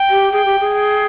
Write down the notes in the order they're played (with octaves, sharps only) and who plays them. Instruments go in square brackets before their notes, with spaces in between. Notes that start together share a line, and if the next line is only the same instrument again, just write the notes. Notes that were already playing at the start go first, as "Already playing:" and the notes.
Already playing: [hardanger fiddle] G5
[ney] G4
[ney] G#4 [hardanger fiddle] G5
[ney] G4
G#4
[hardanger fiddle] G5